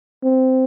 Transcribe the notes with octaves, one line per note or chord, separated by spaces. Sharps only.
C4